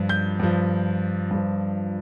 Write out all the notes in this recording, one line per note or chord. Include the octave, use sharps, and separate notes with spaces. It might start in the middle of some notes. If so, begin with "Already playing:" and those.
Already playing: G2 F3
G6
G2 F3
G2 F3